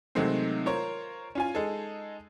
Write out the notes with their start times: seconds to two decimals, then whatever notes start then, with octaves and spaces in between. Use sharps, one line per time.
0.15 C3 D#3 F#3 G#3 A3 C4
0.66 F4 A#4 C5 C#5
1.35 C#4 F4 G#5
1.55 G#3 D#4 G#4 A4